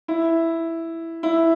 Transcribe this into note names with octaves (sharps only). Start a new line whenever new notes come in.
E4
E4